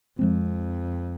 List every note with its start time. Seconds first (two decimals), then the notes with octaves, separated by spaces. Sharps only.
0.18 F2 F3 G#3 C4